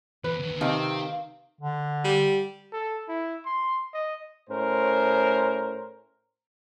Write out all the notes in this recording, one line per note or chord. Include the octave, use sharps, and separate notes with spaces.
E2 B4
D#2 D3
C3 D#3 C4 F5
D3
G3
A4
E4
C6
D#5
A2 C#4 A#4 C5